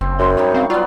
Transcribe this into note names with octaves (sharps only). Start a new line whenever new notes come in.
F#1 C4
F#2 C6
G3 D#4 C#5 C#6
C4 F5
F#3 B3 F4 D5